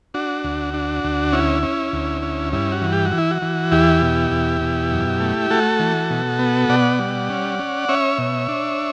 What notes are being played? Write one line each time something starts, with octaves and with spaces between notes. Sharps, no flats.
D4 F#4
D2
D4
D2
C#4 E4
C#4
D2
C#4
G2 E4
F#4
E3
G4
F#4
E3
E4
F#4
E3
E2 E4 G4
B2
E2
B2
F#2
A3
A3 F#4 A4
E3
B2
B3
B2 D5 F#5
G3
C#4
C#4
C#4 C#5 E5
B2
D4